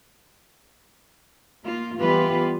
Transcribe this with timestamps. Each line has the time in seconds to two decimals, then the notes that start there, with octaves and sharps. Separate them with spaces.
1.64 A#3 F4
1.99 E3 G3 B3 F4 G4 B4